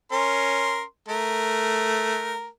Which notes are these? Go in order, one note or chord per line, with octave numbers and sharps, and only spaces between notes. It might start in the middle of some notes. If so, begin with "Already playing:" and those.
C#4 A#4 C6
A3 A#4